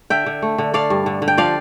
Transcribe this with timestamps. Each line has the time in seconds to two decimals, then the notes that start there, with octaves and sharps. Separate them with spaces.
0.10 D3 E5 G5
0.26 D3
0.42 A3
0.58 D3
0.74 A3 D5 F5
0.90 G2
1.06 D3
1.22 D3
1.28 G5
1.38 F3 D5 F5